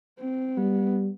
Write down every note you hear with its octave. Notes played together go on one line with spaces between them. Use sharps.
C4
G3 B3